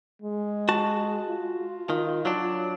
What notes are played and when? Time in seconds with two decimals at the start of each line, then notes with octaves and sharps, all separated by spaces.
0.22 G#3
0.69 F#4 A5
1.29 F4
1.90 D#3
2.25 F#3 D4